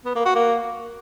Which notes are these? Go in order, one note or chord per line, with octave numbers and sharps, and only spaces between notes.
B3
A#3
F#4
A#3